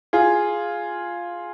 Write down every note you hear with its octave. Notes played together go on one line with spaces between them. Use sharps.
F4 G#4